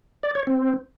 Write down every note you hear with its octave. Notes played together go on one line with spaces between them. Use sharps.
D5
C#5
C4